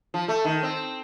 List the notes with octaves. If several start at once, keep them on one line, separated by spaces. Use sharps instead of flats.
F3
A3
D#3
C4